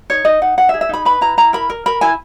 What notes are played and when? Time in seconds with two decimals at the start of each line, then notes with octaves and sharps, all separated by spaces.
0.10 D#4 C#5
0.25 D#4 D#5
0.42 D#4 F#5
0.57 D#4 F#5
0.69 E5
0.74 G#4
0.81 E5
0.89 D#4 B5
1.05 B4 B5
1.21 E4 A#5
1.37 E4 A#5
1.53 A#4 B5
1.70 A#4
1.86 A#4 B5
2.01 E4 G#5